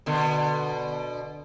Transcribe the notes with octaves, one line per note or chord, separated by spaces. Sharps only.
B2 D3